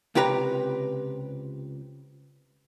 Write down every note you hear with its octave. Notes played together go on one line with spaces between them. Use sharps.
C#2 C3 G4 B4 A#5